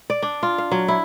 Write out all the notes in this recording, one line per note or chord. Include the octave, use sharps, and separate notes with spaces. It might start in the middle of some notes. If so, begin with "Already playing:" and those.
D5
D4
F4
F5
F#3
E4